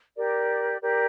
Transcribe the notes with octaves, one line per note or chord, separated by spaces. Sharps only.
G4 A#4 D5
G4 A#4 D5